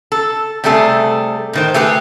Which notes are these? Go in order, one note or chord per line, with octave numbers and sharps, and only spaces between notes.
A4
C3 G3 A3 G#4 A4
A2 D#3 C5
A3 G4 G#4 B4